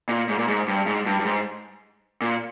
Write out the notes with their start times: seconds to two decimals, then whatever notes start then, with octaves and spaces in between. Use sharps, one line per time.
0.09 A#2
0.29 G#2
0.39 A#2
0.48 G#2
0.68 G2
0.87 G#2
1.06 G2
1.20 G2
1.25 G#2
2.21 A#2